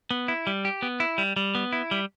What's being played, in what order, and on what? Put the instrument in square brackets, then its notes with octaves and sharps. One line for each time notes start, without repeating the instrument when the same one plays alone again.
[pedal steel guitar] B3
E4
G3
G4
B3
E4
G3
G3
B3
E4
G3